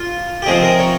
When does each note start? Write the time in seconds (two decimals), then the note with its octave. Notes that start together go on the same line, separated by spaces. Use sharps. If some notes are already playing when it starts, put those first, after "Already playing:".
Already playing: F4
0.42 G4
0.46 C3 F3 C4 D#4 G#4
0.62 A#4
0.79 C#5